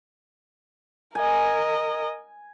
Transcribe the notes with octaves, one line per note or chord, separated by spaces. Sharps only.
A#4 D#5 G#5